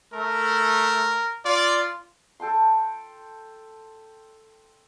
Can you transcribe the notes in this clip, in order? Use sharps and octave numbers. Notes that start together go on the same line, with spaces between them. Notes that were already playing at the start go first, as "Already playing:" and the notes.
A3 A#4
F4 D5
A4 G5 A5 C6